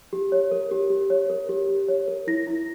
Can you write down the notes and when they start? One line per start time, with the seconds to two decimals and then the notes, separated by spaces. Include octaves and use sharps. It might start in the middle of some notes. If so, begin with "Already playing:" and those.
0.13 G4
0.32 C#5
0.51 A#4
0.71 G4
0.90 G4
1.10 C#5
1.30 A#4
1.49 G4
1.69 G4
1.88 C#5
2.08 A#4
2.27 E4 A#6
2.47 E4